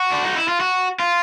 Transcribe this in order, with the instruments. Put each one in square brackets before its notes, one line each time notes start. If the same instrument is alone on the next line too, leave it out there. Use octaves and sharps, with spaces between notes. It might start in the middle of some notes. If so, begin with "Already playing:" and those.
Already playing: [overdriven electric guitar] F#4
D4
D#4
E4
F4
F#4
F4